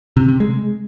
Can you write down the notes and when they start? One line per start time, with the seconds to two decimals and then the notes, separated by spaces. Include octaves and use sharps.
0.17 C3
0.28 C3
0.40 G#3